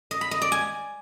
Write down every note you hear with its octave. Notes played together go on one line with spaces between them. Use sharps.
D#5
B5
D#5
D5
G#5